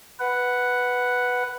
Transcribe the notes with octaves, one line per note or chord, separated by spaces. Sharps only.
B4 F#5